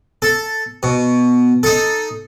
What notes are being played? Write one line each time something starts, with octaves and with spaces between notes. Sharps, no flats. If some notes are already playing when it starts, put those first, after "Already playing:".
A4
B2
D#4 A4